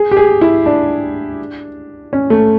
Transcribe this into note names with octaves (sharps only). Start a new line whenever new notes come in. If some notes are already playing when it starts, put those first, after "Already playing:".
Already playing: G#4
G4
G#4
E4
D4
C#4
A3